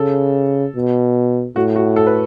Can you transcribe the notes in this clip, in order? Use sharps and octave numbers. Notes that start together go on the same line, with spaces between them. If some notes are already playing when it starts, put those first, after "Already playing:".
Already playing: C#3 A4
B2
A2 F#4
F#4
A4
B4